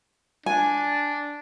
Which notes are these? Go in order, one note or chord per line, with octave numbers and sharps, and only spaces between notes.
D4 G#5